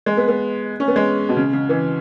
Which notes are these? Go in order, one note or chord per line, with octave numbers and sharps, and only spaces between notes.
G#3
B3
B3
C#4
B3
G#3
B2
C#3
C#3
E3